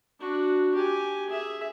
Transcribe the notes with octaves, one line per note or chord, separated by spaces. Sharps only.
D4 F#4
G4 G#5
G#4 E5